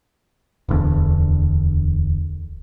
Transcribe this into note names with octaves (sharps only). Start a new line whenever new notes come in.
D1 E2 D3